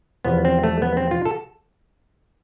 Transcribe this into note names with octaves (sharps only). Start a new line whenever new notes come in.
E2 C3 F3 B3
C4
A3
B3
C4
F4
A4